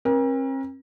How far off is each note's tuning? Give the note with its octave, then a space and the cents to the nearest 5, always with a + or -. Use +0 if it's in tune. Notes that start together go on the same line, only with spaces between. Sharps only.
C4 +45 A#4 +35